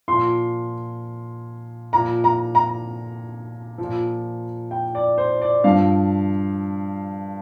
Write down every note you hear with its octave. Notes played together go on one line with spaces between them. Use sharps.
A#2 F3 C6
A#2 F3 A#5
A#5
A#5
F3
A#2
G5
D5
C5
D5
G2 F3 F5